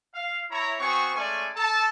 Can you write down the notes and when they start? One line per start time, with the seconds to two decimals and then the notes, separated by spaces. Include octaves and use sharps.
0.14 F5
0.51 E4 C#5 A#5
0.79 B3 C4 F#4 G#5 C#6
1.15 G#3 A3 C#4 D5 G#5 C#6
1.56 A4 A5